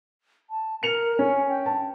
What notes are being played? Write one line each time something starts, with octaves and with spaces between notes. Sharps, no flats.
A5
A#4 C#7 F7
C#4 G#5
G5
A5